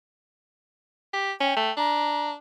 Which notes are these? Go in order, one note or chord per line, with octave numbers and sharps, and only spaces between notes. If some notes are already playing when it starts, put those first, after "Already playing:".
G4
C#4 G5
A3
D4 A#5